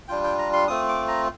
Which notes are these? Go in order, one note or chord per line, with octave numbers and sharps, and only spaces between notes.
G3 D4 F4 G5
G5
A#5
C6
A3 C4 F4 D#6
D6
A#5